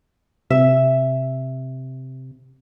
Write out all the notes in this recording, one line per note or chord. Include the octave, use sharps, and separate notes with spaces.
C3 E5